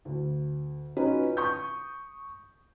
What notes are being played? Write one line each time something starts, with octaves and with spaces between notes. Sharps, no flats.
D2
C#4 D#4 F4 F#4 B4
C#6 D#6 G6